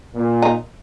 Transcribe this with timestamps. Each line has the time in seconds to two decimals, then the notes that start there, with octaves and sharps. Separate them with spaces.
0.15 A#2
0.42 D#4